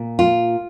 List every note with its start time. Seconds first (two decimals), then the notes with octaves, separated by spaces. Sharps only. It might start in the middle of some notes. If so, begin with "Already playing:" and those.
Already playing: A#2
0.19 F4